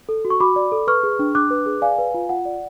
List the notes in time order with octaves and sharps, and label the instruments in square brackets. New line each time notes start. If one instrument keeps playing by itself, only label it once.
[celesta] A4
F#4
C#6
F#4 B5 D6
D5
A4
B4 C#6 F6
G#4
D4
D4 D6 F#6
B4
G#4
D5 F5 G#5
B4
F4
F4 F#5
D5